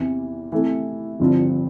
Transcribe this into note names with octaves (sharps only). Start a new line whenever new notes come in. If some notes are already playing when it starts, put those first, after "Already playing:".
Already playing: E2 C3 E3
C3 E3 A3 E4
G1 G2 F3 C4 F4